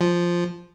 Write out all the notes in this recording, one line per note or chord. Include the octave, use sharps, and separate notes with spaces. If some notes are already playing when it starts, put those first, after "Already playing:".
F3